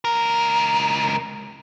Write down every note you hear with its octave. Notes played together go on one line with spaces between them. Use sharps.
C#2 A#4